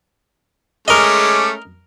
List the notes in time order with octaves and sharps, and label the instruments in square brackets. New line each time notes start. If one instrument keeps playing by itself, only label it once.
[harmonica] G#3 A3 C#4 [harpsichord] A#4 D#5 [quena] D6